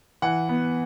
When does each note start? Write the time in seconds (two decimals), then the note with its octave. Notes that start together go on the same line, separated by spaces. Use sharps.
0.22 E3 F#5
0.49 B3